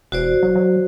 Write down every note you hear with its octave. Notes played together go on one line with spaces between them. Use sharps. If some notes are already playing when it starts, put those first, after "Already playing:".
E1 F#4 C5 D5
F#3
F#3